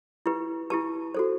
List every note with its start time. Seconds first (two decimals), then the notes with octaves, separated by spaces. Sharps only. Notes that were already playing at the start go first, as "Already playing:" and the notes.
0.26 E4 G4 B4
0.70 E4 G4 B4 A5
1.15 F#4 A4 C5